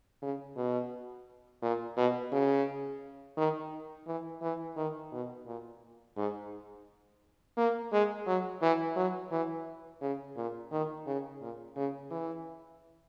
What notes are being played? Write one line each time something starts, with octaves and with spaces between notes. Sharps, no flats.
C#3
B2
A#2
B2
C#3
D#3
E3
E3
D#3
B2
A#2
G#2
A#3
G#3
F#3
E3
F#3
E3
C#3
A#2
D#3
C#3
A#2
C#3
E3